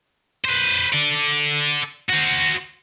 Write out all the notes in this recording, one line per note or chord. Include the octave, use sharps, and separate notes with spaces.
B4 C5
A4 D5
F#4 C5